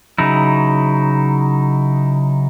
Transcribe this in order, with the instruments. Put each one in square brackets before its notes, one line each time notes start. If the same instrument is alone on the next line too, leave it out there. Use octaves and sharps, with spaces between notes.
[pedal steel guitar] C#3 F#3 D#4 E4